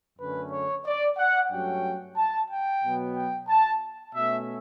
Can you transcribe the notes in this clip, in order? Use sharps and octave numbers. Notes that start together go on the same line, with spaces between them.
F#2 D3 A3 C#4 B4
C#5
D5
F#5
G2 F#3 A3 C#4 G5
A5
G5
B2 F#3 B3
G5
A5
B2 A3 C#4 E5